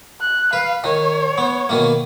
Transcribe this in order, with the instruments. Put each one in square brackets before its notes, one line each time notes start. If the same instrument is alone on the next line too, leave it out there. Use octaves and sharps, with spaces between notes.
[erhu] F#6
[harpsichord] B4 [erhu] F5
[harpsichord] D#3 [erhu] C#5
[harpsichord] B3
B2 D#3 A#3